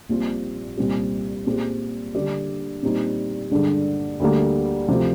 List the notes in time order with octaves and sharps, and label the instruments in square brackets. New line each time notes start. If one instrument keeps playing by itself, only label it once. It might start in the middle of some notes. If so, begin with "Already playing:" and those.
[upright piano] A#1 A#2 G3 C4 F4
C2 A#2 G3 C4 G4
A#2 G#3 C4 G4
D3 G3 D4 G4 D5
A#2 G3 C4 D#4
G2 D3 G#3 D4
D2 D3 G3 A#3
D2 C3 F3